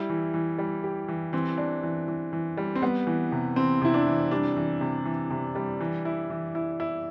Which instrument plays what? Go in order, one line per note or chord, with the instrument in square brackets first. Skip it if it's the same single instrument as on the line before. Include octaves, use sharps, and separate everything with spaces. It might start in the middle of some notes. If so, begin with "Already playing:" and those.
Already playing: [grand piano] G3 [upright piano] E4
[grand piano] E3
E3
G3
G4
E3
[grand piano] E3 [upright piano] C4
[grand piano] D4
E3
E3
E3
G3
[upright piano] C4
[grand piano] G3 [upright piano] B3
[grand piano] E3
C3
[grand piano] E3 [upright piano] C4
[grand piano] C3 [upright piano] E4
[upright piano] D4
[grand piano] E3
[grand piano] G3 [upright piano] D4
[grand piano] E3
C3
E3
C3
G3
E3
E4
E3
E4
E4